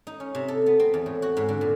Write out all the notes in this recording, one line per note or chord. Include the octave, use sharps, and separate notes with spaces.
D#4
C#4
C3
A4
B3
C4
E2
A2
F#4
G#2
D3
A#2